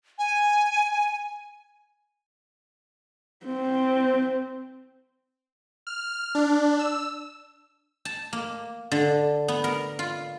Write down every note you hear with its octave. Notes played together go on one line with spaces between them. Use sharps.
G#5
C4
F6
D4
E6
A5
A#3
D3
B3
A#4
F4